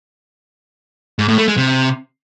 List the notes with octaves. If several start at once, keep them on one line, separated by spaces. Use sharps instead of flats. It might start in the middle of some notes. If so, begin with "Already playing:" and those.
G#2
A2
A3
G#3
C3